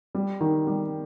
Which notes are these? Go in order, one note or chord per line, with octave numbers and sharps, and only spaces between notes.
G3
D#3
G3